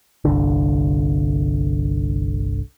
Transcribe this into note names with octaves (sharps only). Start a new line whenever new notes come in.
G1 C2 D3